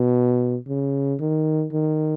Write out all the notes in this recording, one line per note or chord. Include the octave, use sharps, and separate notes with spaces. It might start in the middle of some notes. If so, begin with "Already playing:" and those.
Already playing: B2
C#3
D#3
D#3